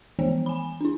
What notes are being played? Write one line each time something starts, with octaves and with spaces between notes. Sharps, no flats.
E3 F3 B3
G#5 B5
D4 E4